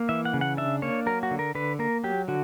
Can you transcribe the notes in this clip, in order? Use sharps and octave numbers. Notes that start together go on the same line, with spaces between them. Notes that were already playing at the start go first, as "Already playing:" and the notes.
Already playing: A#3
E3 E5
F#5
C#3
F#5
D4 E5
A#3 C#5
F#3 A#4
F#4
D3
A#4
D3 B4
A#3 A#4
F#3 G4
D3 F#4